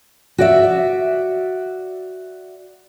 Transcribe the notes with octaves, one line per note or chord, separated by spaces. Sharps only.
F#4 D5 E5